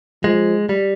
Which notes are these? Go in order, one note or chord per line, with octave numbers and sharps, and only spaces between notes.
F3 G#3
G3